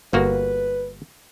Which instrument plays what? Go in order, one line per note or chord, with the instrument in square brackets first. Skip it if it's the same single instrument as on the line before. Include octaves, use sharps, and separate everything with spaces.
[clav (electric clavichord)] G1 A#3 F#4 [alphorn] B4